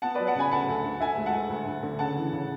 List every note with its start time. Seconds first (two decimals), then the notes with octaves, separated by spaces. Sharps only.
0.02 B3 F#5 A5
0.15 F#3 B4 D5
0.27 F#5 A5
0.35 C#3 G#5 B5
0.51 D2 F#5 A5
0.68 D2
0.85 D2
1.00 D2 E5 G#5
1.18 G#3
1.26 F#5 A5
1.34 D2
1.50 D2
1.67 D2
1.83 D3
1.99 C#3 F#5 A5
2.16 E3
2.33 C#3